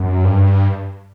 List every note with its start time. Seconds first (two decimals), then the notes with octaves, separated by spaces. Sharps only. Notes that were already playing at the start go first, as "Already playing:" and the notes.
Already playing: F#2
0.24 G2